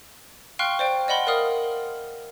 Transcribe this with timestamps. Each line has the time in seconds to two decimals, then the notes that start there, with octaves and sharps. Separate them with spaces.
0.59 F5 G5 C6 C#6 F6 F#6
0.79 C5 D5 G5
1.08 D5 D#5 F#5 B5 C6
1.27 A#4 D5 F5 D#6 F6